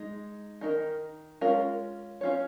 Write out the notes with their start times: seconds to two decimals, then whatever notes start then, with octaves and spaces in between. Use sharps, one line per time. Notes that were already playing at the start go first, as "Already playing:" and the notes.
Already playing: G#3 D#4
0.61 D#3 G#3 D#4 A#4
1.41 G#3 C#4 F4 A#4
2.21 C#4 F4 C#5